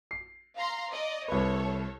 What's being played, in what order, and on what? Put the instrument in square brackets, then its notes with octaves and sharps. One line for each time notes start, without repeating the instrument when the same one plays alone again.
[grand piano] C7
[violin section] F5 A#5 C6
D5 D#5
[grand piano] C2 B4 [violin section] A4 C#5